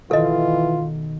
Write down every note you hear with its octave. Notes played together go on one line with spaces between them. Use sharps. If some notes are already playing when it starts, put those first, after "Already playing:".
B2 D#3 E3 A3 F4 A4 D#5